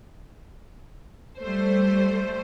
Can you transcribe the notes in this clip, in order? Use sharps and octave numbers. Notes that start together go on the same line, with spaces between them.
G3 A3 C5